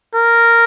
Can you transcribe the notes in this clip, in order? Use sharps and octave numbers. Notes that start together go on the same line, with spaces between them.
A#4